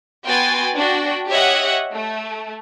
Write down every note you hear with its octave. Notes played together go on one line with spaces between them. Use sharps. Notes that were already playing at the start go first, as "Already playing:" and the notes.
B3 F#4 G5 G#5 C6 A6
D4 F#4 G5
G4 C#5 D#5 E5 F#5
A3